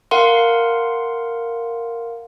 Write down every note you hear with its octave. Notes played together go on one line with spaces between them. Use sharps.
A#4 F5 F#5 C6